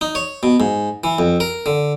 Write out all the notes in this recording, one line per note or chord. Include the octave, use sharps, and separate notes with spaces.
D#4
C#5
B2
G#2
E3
F2
A#4
D3